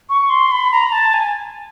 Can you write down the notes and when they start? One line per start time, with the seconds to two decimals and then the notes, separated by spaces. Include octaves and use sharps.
0.10 C#6
0.30 C6
0.52 B5
0.72 A#5
0.92 A5
1.14 G#5